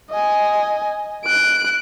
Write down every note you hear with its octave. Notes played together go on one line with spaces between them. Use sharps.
D#5 G#5
F#6 D7